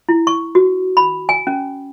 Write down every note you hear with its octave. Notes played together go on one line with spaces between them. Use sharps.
E4
C#6
F#4
B5
G#5
C#4